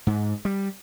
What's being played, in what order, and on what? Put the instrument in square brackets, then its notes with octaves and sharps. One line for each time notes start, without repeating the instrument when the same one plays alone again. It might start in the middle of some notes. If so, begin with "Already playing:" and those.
[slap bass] G#2
G3